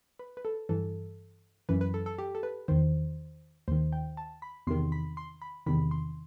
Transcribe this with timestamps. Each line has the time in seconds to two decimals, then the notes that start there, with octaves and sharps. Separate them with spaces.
0.19 B4
0.37 B4
0.45 A4
0.69 G2 E3 A4
1.69 F#2 E3 B4
1.81 B4
1.94 A4
2.06 A4
2.18 G4
2.35 A4
2.43 B4
2.68 E2 D#3 C5
3.68 D#2 D#3 C5
3.93 G5
4.17 A5
4.42 B5
4.67 E2 C3 D#3 C6
4.92 B5
5.17 C6
5.42 B5
5.66 E2 C3 D#3 B5
5.91 C6